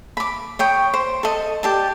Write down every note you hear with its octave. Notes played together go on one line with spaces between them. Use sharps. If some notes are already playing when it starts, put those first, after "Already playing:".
B5 D6
C#5 G5 D#6
C5
A4 D#5
G4 D5 A5